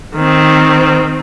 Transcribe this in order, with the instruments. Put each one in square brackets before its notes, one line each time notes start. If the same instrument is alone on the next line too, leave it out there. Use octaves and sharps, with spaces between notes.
[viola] D#3 C4